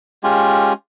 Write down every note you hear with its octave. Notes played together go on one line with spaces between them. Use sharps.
G#3 C#4 F4 G4